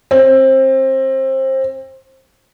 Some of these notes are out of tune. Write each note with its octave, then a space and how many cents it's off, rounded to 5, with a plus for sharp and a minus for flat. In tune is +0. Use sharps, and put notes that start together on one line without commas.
C4 +25